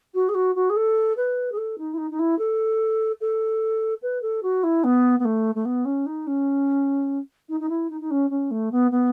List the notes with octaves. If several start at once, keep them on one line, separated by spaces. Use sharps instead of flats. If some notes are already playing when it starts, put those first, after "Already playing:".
F#4
G#4
F#4
F#4
G#4
A4
B4
G#4
A4
D#4
E4
D#4
D#4
E4
A4
A4
B4
A4
F#4
E4
B3
B3
A3
A3
B3
C#4
D#4
C#4
D#4
D#4
E4
D#4
D#4
C#4
C#4
A3
B3
B3